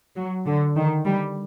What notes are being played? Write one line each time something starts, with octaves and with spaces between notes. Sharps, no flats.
F#3
D3
D#3
G3